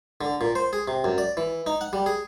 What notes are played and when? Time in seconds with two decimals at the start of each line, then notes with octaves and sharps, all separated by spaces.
0.21 D3
0.41 A#2
0.55 C5
0.73 G#4
0.88 C3
1.04 F#2
1.18 D5
1.37 E3
1.66 D#4
1.81 F#5
1.93 G3
2.06 G#4